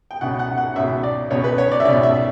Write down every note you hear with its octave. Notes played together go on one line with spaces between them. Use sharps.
G5
C#2 B2 F#5
F#5
F#5
C#2 B2 E5
D5
C#2 B2 C#5
B4
C#5
D5
E5
C#2 B2 D5
E5